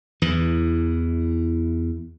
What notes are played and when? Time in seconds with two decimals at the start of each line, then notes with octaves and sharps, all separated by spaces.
0.22 E2 E3